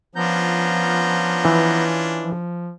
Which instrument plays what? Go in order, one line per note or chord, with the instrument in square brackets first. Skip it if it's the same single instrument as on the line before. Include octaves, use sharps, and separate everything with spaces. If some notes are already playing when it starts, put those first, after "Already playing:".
[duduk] F3 [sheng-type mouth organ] B3 A#5 G6 [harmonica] C#4 D4 F4
[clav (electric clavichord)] E3
[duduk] F3